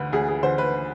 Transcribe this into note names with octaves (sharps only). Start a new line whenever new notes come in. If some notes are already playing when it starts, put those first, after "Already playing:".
Already playing: D2 D3 B4
D2 G#4
G#4
D3 C5
B4